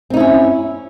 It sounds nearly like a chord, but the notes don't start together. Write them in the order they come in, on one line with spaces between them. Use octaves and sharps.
C4 D#4 E4 C#4